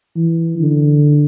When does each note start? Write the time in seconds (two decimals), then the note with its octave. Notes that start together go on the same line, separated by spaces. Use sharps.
0.16 E3
0.59 D3